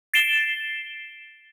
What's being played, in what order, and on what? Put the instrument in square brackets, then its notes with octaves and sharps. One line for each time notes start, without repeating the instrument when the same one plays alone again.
[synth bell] A6 C7 D7 E7 G7